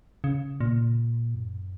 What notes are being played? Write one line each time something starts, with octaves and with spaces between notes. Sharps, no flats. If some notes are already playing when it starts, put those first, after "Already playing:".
C#3
A#2
F#2